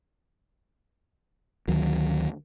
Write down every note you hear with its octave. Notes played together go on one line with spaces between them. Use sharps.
D2 D#3 F#3